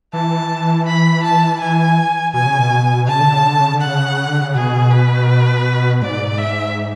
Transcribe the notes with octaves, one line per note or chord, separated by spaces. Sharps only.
E3 A5
B5
A5
E3 G#5
B2 G#5
C#3
B2
C#3 A5
D3
C#3
D3
C#3
D3
F#5
C#3
D3
C#3
B2 G#4
B4
G#2 D5
E5